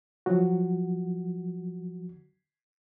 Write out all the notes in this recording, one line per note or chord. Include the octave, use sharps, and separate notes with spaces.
F3 F#3 F#4